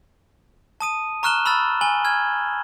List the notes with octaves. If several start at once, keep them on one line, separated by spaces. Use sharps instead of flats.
A5 D#6 D#7
A#5 C#6 F6 F#6 E7 G7
B5 E6 F6 A6
G#5 F#7 G7
F6 G#6